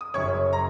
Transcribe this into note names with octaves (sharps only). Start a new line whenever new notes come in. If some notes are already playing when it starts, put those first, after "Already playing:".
D#6
F#1 F#2 F#3 C#5 C#6
A#5